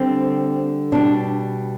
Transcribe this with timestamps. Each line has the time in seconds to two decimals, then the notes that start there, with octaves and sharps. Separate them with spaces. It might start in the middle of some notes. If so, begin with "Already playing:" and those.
Already playing: D3 G3 C4
0.92 B2 G3 D4